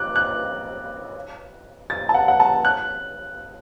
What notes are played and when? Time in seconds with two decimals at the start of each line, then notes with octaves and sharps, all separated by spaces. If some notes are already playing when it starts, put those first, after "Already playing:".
Already playing: D6 F#6
0.16 F#6
1.90 A6
2.09 A5
2.14 F#5
2.28 F#5
2.40 A5
2.65 F#6